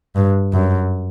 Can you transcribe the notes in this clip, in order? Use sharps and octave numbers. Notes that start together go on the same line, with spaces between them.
G2
F#2